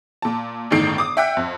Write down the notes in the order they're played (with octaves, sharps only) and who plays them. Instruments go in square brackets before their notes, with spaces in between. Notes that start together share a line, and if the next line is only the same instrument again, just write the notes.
[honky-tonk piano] A#2 A5
G1 C#2 A2 D#3 C7 D7
D6 D#6
E5 F#5 G5 E6 F#6 B6
F2